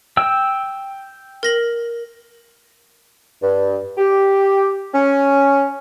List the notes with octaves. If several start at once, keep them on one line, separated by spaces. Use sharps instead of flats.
G5 E6
A#4 A#6 F#7
G2
G4
C#4